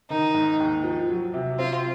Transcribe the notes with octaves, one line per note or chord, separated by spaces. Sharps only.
D#3 D#4
G#2
D#2
F3
F#3
C3
C4 F4